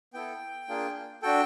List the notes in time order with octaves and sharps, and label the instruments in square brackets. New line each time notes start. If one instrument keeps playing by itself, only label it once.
[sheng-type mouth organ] B3 E4 A4 G5
A#3 D4 F4 G#4
D4 F#4 A4 G5